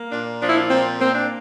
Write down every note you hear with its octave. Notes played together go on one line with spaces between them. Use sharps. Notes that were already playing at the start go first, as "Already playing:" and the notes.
Already playing: A#3
A#2 D4
F3 D4
E4
D4
A#2 C4
A#3 C4
D4